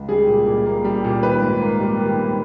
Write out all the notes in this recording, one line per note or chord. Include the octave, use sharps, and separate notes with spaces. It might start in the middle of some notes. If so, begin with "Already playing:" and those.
Already playing: C#2
G3 G#4
A#2
A#2
A#3
G3
A#2
D#3 B4
G#2
A#3
G3
D#3
G#2